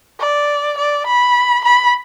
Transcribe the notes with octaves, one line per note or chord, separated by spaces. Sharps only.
D5
D5
B5
B5